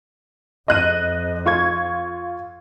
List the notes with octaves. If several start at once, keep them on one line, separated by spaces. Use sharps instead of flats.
F2 D#5 F#6 D#7
F4 C#6 G#6